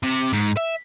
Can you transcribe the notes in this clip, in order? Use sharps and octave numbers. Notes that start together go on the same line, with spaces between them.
C3
G#2
E5